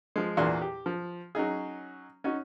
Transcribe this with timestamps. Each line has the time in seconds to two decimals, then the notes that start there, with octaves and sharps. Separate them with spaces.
0.16 F3 G#3
0.37 E2 A#2 D4 F#4 G#4 C6
0.62 G4
0.86 F3
1.35 F#3 C#4 D#4 G#4
2.24 C#4 D#4 F#4